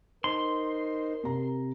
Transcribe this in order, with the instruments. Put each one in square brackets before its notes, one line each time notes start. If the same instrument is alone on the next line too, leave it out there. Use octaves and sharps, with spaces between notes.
[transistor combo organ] D#4 C5 [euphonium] A#4 [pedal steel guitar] C6
[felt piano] C3 A#5